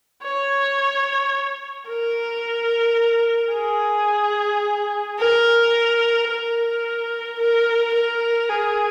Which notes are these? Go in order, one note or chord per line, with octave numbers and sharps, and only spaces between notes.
C#5
A#4
G#4
A#4
A#4
A#4
A#4
G#4